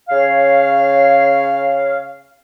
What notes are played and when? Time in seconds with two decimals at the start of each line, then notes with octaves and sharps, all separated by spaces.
0.09 C#3 C#5 F5